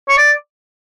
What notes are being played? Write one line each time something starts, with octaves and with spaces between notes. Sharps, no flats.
C#5
D5